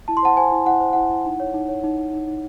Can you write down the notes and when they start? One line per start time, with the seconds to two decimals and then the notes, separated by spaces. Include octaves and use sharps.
0.08 E4 A5
0.17 C6
0.23 C5 F#5 A5
0.37 C5 G#5
0.52 E4
0.66 E4 F#5
0.80 C5
0.93 E4 F#5
1.10 E4
1.25 D#4
1.40 C#5
1.54 D#4
1.68 C#5
1.84 D#4
1.98 D#4
2.13 D#4
2.28 D#4